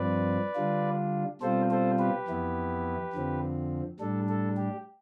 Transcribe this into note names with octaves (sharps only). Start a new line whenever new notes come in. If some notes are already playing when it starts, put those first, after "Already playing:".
Already playing: G2 F3 C4 B4 D5
D3 G3 D4 F4
B2 G3 C4 F4 A4 C5
A4 C5
G4 B4
F2 E3 B3 E4
F2 D3 F3 C4
A2 G3 D4 A4
A4
G4